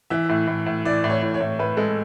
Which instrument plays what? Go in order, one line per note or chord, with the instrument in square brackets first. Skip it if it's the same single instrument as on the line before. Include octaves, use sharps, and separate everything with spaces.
[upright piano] E3 [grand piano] E5
[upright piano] A2
A2
A2
[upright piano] E3 [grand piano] D5
[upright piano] A2
[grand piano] C#5
[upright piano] A2
[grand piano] C#5
[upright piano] A2
[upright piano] A2 [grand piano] B4
[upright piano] G#3 [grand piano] A4